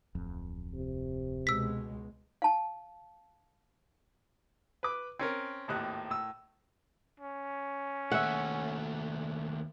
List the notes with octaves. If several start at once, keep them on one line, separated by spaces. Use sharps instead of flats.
D1 F2
C3
C#2 B2 G#3 E6 B6
F5 A5
B4 D6
C4 C#4 A#4
G#1 D#2 A2 F#6
A2 E6
C#4
D#2 A3 E5 F#5